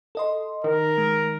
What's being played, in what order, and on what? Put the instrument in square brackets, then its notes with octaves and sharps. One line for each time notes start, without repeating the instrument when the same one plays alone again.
[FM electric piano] A4 D#5 C6
[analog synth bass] D#3 [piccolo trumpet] A#4
[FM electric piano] G#3